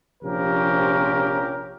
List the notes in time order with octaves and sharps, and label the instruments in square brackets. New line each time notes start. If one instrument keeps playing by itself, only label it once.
[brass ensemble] A#1 C3 F3 C#4 G4 A#4